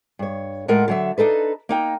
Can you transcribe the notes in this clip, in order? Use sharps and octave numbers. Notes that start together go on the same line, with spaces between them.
G2 C#5
A2 G#3 F4 A#4 F#5
D3 F#3 E5
D4 D#4 A4 B4
A#3 D#4 G5